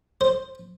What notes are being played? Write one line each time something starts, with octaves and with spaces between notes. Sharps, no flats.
C5